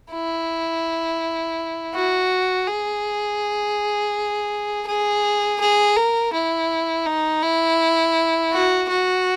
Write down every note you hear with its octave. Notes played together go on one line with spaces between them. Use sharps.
E4
F#4
G#4
G#4
G#4
A#4
E4
D#4
E4
F#4
F#4